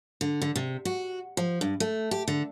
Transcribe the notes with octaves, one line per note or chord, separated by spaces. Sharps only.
D3
D3
C3
F#4
F3
G2
A3
G4
D3